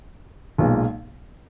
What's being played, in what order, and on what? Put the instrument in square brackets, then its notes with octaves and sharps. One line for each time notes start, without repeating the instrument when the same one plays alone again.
[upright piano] B1 A#2 G#3